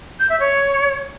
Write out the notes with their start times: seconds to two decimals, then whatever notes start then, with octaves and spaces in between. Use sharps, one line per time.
0.20 G6
0.30 E5
0.40 C#5